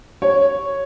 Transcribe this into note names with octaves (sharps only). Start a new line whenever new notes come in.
C#5